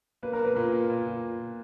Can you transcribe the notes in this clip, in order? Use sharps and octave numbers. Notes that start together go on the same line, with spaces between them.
A#3 B4
A#4
A#3 B4
A#2 A#4
A#3
A#2
A#2